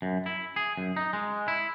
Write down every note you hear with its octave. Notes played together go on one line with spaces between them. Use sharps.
F#2
E4
G#4
F#2
D#4
G#3
E4